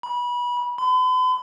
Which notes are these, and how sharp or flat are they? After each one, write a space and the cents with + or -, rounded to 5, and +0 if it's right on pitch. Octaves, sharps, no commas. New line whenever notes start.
B5 -25
B5 +45